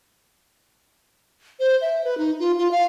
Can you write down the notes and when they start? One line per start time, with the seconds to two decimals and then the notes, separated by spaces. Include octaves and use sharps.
1.60 C5
1.82 E5
2.04 B4
2.18 D#4
2.40 F4
2.58 F4
2.71 F5